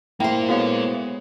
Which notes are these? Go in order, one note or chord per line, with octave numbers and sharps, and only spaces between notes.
A#2 A#3 E4 C5 G5
G#3 B3 F#4 A4 C#5 F5